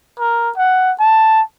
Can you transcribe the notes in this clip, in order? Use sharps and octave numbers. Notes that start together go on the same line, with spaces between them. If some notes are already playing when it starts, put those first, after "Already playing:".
A#4
F#5
A5